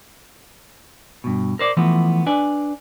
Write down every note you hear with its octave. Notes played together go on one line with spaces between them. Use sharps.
G2 B2
A#4 C5 D5
E3 F3 A3 B3
D4 B4 D5 G#5